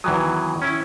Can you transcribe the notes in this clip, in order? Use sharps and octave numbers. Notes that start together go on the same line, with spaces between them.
E2 D#3 E3 F#3 G5 D#6
C#4 E4